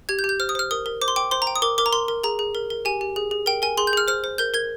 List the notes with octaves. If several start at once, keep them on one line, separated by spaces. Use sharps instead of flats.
G4 G#6
G6
G4
G6
C5 F6
D#6
C5 F6
A#4 D#6
A#4
C5 D6
C6
G5 D6
C5 C6
A#5
G5
D#6
A#4 D6
A#4 D6
A#5
A#4 C6
A#4
G#4 A#5
G#4
A#4
A#4
G4 G#5
G4
G#4
G#4
A#4 G5
A#4 G#5
G#4 C6
G6
G#4 F6
C5 F6
C5
A#4 G6
A#4 G#6